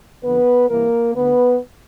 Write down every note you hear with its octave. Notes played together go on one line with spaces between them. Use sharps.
F2 D3 B3 B4
C2 C3 E3 A#3 A#4
D2 D3 B3 B4